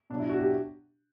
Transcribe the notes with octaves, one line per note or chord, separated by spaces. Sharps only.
B2 F#3 D4
E4
F#4
G4